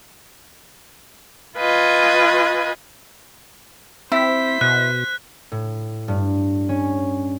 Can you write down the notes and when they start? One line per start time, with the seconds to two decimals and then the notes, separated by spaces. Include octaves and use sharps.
1.57 F4 B4 D#5 G#5
4.12 C4 E4 C5 B6
4.61 B2 F#6
5.52 A2
6.08 G2
6.69 C#4